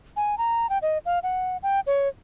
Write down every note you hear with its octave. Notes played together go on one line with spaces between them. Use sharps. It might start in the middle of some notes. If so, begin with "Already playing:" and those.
G#5
A#5
G5
D#5
F5
F#5
G5
C#5